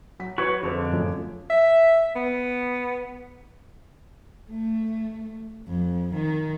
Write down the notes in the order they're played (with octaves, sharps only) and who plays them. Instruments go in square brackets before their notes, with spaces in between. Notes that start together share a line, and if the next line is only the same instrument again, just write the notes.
[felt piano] F#3 B6
[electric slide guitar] F#4 B4 C#5 [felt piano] G#6
[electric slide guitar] F2 D3 [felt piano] G#4 C5
[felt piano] F#2 F3 A3
[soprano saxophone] E5
B3
[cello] A3
F2
D#3